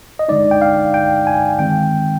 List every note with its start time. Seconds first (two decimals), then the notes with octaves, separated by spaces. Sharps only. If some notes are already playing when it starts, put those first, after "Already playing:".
0.19 D#5
0.28 D3 G#3 D#4 D5
0.51 G5
0.62 F5
0.94 G5
1.27 G#5
1.59 D#3 G#3 C4 G5